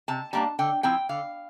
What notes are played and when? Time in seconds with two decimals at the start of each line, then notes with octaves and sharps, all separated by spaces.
0.08 C3 A5
0.33 G3 A#3 D4 A5
0.59 D3 G5
0.83 F3 C4 E4 G5
1.09 D3 F5